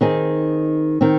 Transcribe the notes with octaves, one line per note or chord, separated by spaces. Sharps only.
D#3 C4 D#4 G#4
D#3 C4